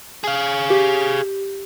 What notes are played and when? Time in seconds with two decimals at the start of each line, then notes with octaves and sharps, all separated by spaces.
0.24 G#4 F5
0.70 G4